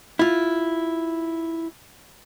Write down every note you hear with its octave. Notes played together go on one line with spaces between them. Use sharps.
E4 F4